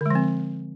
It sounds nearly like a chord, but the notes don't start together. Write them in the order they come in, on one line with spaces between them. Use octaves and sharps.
D3 G#3 F3 C4